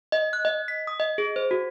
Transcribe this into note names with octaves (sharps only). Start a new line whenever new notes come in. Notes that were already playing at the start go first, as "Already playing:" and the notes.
D#5
F#6
D#5
B6
D#6
D#5
G#4
C5
F#4